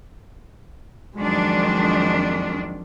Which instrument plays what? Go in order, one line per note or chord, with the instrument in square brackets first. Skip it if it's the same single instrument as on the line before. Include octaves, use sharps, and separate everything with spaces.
[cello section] F2 D#3 D4 [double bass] F#3 G#3